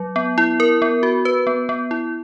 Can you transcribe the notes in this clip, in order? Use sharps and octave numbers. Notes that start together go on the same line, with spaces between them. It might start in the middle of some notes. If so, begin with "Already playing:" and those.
Already playing: F#3
B3
E4
A#4
B3
F#4
B4
B3
B3
E4